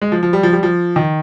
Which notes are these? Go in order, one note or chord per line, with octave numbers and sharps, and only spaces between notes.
G#3
F3
F3
G3
F3
G3
F3
D#3